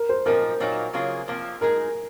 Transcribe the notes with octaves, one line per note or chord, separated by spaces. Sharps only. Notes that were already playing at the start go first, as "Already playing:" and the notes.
Already playing: A#4
C5
A#2 F3 C4 D#4 A#4
A#2 F#3 A#3 D#4
C#3 F#3 A#3 F4 G#4
C3 F3 A#3
G#3 D#4 G#4 A#4